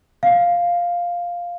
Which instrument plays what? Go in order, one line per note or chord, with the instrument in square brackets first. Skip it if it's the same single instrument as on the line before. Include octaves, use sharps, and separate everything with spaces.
[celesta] F5